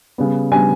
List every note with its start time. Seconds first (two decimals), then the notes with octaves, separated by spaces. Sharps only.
0.18 C#3 G3 B3
0.52 C#3 G3 B3 G#5